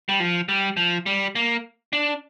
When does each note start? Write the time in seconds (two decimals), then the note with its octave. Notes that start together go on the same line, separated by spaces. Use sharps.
0.09 G3
0.20 F3
0.49 G3
0.77 F3
1.06 G3
1.35 A#3
1.93 D4